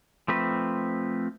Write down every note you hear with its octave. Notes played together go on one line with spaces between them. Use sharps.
F3 A3 C4 B4